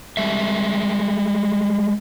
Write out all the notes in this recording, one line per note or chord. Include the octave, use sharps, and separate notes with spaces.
G3 G#3 E5